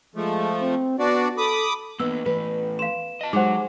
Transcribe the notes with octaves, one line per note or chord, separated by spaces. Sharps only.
F3 G#3 A3
C4
B3 D4 F#4 D5
A4 B5 D6 D#6
E3 A#3 B3 E6
A2 E3 B4
F5 C6 E7
D#5 A5
F#3 G#3 D#4 G4 C5 F#5 D6